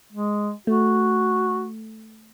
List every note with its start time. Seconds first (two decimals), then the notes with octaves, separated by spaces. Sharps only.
0.12 G#3
0.67 A3 F#4